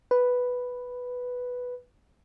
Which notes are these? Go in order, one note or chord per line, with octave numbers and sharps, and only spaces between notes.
B4